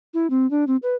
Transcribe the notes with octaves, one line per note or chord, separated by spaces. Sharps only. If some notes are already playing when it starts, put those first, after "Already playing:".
E4
C4
D4
C4
B4